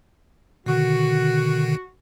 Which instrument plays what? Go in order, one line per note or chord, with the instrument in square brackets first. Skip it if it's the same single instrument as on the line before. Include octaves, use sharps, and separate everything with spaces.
[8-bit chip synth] B2 D3 D#3 [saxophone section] F#4